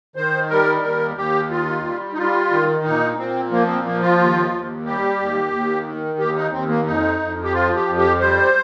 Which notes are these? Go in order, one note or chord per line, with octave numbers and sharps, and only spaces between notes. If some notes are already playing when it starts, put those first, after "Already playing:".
D#3 C5
G3 A#4
D#2 A#4
D#2 G4
D#3 F4
G3
D#4
G3 F4
D#3
A#2 D#4
A#2 C4
F3 A#3
C4
F3 A#3
F4
D#2
D#2
G3 G4
D#2
D#2
D#3
D#2 G4
D#4
D#2 C4
A#3
F2 D#4
F2
G4
F3 F4
G4
F2
G4
G3 C5